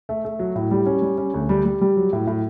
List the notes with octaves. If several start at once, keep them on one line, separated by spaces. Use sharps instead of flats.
A3
A3
F#3
A2
G3
C#4
G3
C#4
D2
G3
G3
G3
F#3
A2
A2